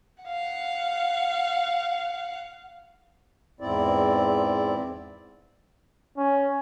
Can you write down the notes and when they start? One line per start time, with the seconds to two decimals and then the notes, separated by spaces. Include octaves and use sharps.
0.24 F5 F#5
3.60 E2 G#2 C4 E4 D5
6.17 C#4